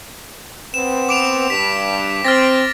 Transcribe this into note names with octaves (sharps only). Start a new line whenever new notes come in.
B3 C4 E7
D6 D7 F7
G2 B6
C4 F6 A6 A#6